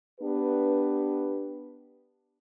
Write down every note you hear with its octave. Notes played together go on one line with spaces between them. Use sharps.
B3 D4 G4 B4